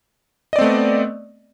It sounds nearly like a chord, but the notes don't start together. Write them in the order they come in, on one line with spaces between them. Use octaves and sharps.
D#5 D5 C4 A3 B3